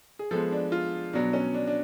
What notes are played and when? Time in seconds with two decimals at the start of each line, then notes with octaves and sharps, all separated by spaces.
0.19 G#4
0.31 F3 G#3 B3 A4
0.52 D4
0.72 F4
1.13 B2 F#3 B3 D4
1.33 C#4
1.54 D4
1.67 D4